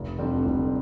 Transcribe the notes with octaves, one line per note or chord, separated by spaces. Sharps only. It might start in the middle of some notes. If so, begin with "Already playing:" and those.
Already playing: F1
F2 D3 G3 C4
F1